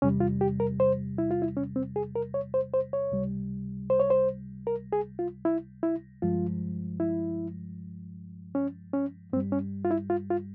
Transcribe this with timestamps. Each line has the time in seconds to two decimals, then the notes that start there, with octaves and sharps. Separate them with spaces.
0.02 E2 C3 G3 C#4
0.20 F4
0.41 G4
0.60 A#4
0.80 C5
1.18 E4
1.31 F4
1.42 E4
1.57 C#4
1.76 C4
1.96 G#4
2.15 A#4
2.34 C#5
2.54 C5
2.74 C5
2.93 C#5
3.12 C#2 C3 G3
3.90 C5
4.00 C#5
4.10 C5
4.67 A#4
4.93 G#4
5.19 F4
5.45 E4
5.83 E4
6.22 G2 F3 G#3 F4
7.00 E4
8.55 C#4
8.94 C#4
9.33 G2 C4
9.36 G3
9.52 C#4
9.85 F4
9.91 E4
10.10 F4
10.30 F4